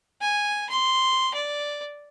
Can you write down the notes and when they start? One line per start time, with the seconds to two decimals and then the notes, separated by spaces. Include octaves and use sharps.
0.21 G#5
0.69 C6
1.34 D5